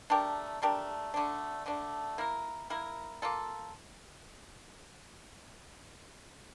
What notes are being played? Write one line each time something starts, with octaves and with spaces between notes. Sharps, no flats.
A3 D4 G4 A#4
A3 D4 G4 A#4
D3 A3 D4
D3 A3 D4
A#3 E4 A#4
A#3 E4 A#4
A#3 F4 A4